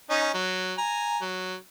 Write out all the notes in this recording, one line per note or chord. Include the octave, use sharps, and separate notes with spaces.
C#4 D#4 D#5
F#3
G#5 A#5
F#3